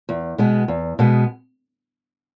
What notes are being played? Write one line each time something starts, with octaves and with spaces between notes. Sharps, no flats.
E2
B2 G#3 B3
E2
B2 G#3 B3